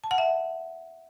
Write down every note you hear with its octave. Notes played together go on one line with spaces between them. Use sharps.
A5
F#5
E5